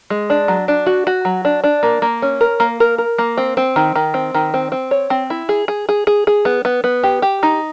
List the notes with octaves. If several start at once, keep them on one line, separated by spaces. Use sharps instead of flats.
G#3
D4
F#3
D4
F#4
F#4
F#3
D4
D4
A#3
A#3
C#4
A#4
A#3
A#4
A#4
A#3
C4
C4
D#3
D#3
C4
D#3
C4
C4
C#5
C4
E4
G#4
G#4
G#4
G#4
G#4
B3
B3
B3
G4
G4
D#4